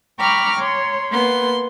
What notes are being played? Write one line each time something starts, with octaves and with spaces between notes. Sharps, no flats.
G5 A#5 B5 C#6 D6 F6
C#5 C6
A#3 B3 C6